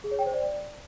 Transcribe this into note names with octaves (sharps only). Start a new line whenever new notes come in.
G#4
C#5
G5
C5
D5